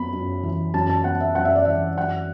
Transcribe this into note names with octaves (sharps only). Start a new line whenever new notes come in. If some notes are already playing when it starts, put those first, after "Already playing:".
Already playing: F#2 B3 B5
F#2
E3
F#2 A5
A5
B3 F#5
E5
F#2 F#5
E5
D5
E3 E5
F#2 F#5